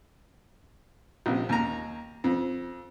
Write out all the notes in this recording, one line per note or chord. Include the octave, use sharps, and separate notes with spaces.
A#1 C3
D#2 A#5
F2